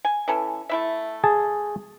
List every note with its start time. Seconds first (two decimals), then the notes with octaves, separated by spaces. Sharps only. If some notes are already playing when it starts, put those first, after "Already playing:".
0.05 G#5
0.28 E3 C#4 A4
0.69 A3 E4 E5
1.24 G#4 A5